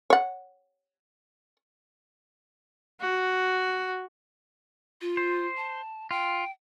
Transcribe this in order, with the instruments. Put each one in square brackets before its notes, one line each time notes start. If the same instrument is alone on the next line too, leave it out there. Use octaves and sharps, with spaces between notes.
[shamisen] C#5 F#5
[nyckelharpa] F#4
[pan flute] F4
[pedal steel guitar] C5
[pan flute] A5
[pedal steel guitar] F4 [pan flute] G5